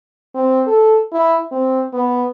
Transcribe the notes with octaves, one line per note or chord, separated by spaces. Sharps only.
C4
A4
E4
C4
B3